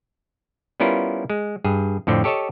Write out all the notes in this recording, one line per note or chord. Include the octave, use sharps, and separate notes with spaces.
G3 B3 C#4 E4 F4 A#4
G#3
G2 G#4
F2 A2 D3 C4
G4 A4 C#5 D#5 A5